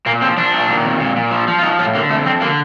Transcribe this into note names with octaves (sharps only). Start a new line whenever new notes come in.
A#2 A#3
F3 C4
F3 D4
A#2
D#3
F2
A#2
A#2
F3
F3
F4
F3 D#4
A2 F4
D3 A#3
F2 A3
F2 C4
D3 A#3